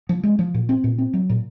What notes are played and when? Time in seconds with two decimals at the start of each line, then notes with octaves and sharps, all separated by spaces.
0.09 F3
0.23 G#3
0.39 F3
0.54 A#2
0.69 C4
0.84 A#2
0.98 C4
1.14 F#3
1.30 A#2